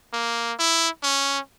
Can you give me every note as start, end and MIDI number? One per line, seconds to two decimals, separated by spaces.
0.13 0.53 58
0.59 0.88 64
1.03 1.39 61